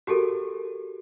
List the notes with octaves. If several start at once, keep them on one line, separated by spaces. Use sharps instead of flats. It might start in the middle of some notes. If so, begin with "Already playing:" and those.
F#4 G4 A4 A#4